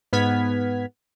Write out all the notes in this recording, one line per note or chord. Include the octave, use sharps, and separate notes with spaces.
G#2 B3 F6 G#6 B6